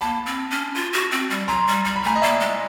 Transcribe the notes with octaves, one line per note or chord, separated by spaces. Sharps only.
A#3 A5 B5
C4
C#4
F4
F#4
C4
G3
F#3 A#5 C6
G3
G3 A#5
B5
A3 G#5 A#5
D#5
A#3 D5 E5
G#3